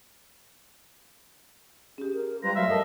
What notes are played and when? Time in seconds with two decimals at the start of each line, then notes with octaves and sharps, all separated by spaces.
1.98 C#4 G4 G#4
2.13 A#4
2.43 G3 F4 B4 C5 A#5
2.55 F#3 A3 E5 F5
2.68 G2 A4 A#4 D#5 A5